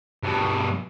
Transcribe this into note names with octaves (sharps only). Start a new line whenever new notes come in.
G2 B2